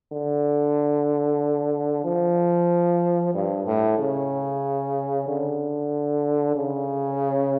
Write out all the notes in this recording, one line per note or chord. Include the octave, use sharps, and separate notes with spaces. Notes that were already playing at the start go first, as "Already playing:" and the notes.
D3
F3
G2
A2
C#3
D3
C#3